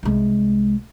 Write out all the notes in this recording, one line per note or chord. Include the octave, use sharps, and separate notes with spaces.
C2 G#3